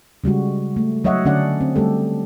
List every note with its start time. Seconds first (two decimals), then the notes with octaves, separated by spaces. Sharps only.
0.24 C#3 G3 G#3 F#4
0.76 A3
1.04 F#3 C#5 D#5 E5 F#5
1.25 D3 C#4 D4 D5 F#5
1.61 C4
1.76 G3 A3 G4 A4